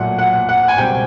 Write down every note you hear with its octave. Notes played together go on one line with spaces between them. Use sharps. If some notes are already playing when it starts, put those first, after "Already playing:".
Already playing: B1 A#2 F#3 A3 F#5
F#5
F#5
G#5
C#2 B2 G3 C4 G5